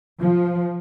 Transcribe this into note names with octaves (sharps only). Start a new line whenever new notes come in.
F3